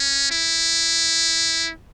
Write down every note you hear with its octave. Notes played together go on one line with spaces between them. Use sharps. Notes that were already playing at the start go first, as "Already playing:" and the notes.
Already playing: C#4
E4